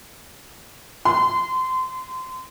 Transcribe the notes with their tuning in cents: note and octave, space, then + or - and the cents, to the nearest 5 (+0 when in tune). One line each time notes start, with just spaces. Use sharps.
C6 -30